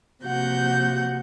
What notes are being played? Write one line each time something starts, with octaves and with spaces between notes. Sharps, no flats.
C3 F3 A#3 F#4 F#5 G6